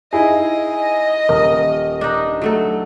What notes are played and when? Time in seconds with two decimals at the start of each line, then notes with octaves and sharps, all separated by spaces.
0.13 D#4 E4 G#4 D#5
1.29 D#1 A#4 D#6
2.01 D4 D#4
2.42 F#3 A3 A4